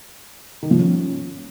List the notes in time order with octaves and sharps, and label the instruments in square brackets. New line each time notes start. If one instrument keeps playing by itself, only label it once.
[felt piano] D#3
F3
C#4